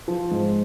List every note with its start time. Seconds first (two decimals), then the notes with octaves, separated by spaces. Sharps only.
0.08 F3
0.31 G#2